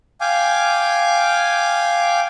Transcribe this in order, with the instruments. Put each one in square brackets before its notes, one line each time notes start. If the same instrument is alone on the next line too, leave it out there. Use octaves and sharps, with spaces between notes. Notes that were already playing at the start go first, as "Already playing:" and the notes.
[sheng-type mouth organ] F5 G5 G#5 D6